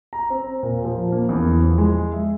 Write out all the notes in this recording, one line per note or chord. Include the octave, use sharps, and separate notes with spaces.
A#5
C4
A#2
F3
A#3
E2
F3
G#3
E5